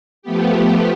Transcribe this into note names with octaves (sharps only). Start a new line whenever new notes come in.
F3 A3 B3 G4